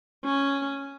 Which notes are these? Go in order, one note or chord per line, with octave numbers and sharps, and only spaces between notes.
C#4